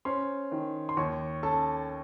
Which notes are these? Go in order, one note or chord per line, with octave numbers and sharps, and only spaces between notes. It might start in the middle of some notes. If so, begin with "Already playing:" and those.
C#4 C5 C6
D#3
C6
D#2 C#5 C#6
C#4 A4 A5